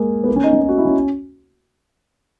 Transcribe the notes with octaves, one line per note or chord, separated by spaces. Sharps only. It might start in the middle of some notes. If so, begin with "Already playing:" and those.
Already playing: G#3 A#3
B3
A#3
C#4
D#4
C#4
D#4
F#4
E4
C#4